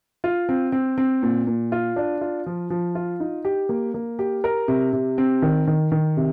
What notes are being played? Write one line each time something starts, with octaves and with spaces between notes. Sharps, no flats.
F4
C4
C4
C4
A#2
A#2
F4
D4
F4
F3
F3
F4
D#4
G4
A#3
A#3
G4
A#4
C3
C3
C4
D#3
D#3
D#3
C3